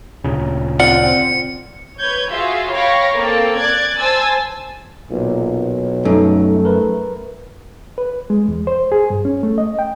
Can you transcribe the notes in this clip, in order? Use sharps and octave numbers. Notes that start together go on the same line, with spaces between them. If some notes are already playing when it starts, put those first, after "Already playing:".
D2 A#2 C#3
C4 F4 D5 F#5 C#7
B4 C#5 G6 G#6
F4 F#4 G#4 E5 F5
C#5 F5 G5 B5 C#6 A#6
A#3 C4 A4 G5
D5 D6 F#6 G#6 A6
C5 G#5 A5 E6 A6
B1 A#2
F#2 G3 A3 D#4 A4
A#4 B4
B4
G#3
E2
C5
G#4
G2
C#4
A3
D#5
G5